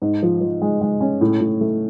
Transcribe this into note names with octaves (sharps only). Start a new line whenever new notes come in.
G#2
F3
F3
G#3
G#3
C#4
A2
A2
A3